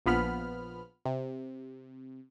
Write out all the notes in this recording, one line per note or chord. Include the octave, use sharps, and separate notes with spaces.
A#1 F3 B3 B5 F6
C3